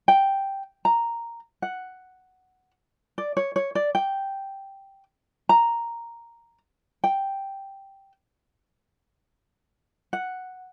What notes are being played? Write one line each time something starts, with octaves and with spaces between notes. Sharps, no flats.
G5
A#5
F#5
D5
C#5
C#5
D5
G5
A#5
G5
F#5